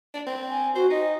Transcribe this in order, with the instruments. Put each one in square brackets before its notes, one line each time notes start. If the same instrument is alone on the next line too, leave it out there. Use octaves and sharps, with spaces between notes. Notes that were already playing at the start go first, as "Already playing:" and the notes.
[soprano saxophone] D4
C4
[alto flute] G#5
[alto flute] F#4 [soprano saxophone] C5
[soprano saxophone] D#4 [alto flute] D#5